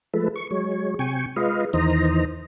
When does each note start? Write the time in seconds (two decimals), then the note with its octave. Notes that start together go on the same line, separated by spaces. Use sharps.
0.14 F3 G#3 A3 A4 B4
0.36 C#6
0.51 F#3 G#3 C#5
0.99 C3 G5 G#5 C#6
1.36 G#3 F4 B4 D#5 F5
1.73 E2 D#3 E3 C5 D#5 A#5